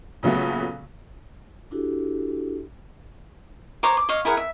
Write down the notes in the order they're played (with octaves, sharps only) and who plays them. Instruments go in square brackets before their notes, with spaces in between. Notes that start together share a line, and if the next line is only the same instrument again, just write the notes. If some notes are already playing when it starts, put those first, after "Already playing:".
[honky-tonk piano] A#2 C#3 F#3 A3 B3
[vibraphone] D4 E4 F#4 G4 A4
[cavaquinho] C5 C#5 A#5 D6
D6
C#5 D#5 F5
E4 G#4 A#4 F#5
E5